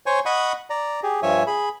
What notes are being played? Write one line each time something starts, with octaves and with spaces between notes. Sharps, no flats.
C5 C#5 G#5 C#6
D#5 F#5 B5 C#6 D#6
D5 A#5
G4 G#4
G2 F3 C#5 E5 G#5
G#4 B5